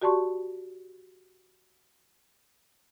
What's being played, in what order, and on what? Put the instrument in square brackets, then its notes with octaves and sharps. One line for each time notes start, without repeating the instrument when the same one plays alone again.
[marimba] F#4 G4 D5 A5 C6 C#6